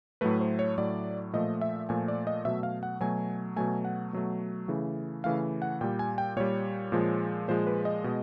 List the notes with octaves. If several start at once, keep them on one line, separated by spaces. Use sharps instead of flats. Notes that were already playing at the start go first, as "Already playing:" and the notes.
A2 F#3 A3 B4
C5
C#5
A2 F#3 A3 D5
A#2 F3 A3 D#5
E5
A#2 F3 A3 G#5
D5
D#5
B2 F#3 A3 E5
F5
F#5
B2 F#3 A3 G#5
B2 F#3 A3 G#5
F#5
B2 F#3 A3
C#3 E3 A3
C#3 E3 A3 F5
F#5
A#2 G3 G5
G#5
G5
A#2 G3 C#5
A#2 F3 G#3
A#2 F3 G#3 C5
B4
D#5
B2 G#3